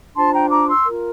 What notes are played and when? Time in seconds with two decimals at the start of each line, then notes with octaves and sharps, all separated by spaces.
0.15 D4 F4 C5 A5 C6
0.33 G5 A#5
0.50 A#5 D6
0.68 C6 E6
0.86 F4 A#4